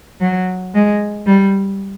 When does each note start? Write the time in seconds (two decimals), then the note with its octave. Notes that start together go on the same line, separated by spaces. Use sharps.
0.21 F#3
0.74 G#3
1.26 G3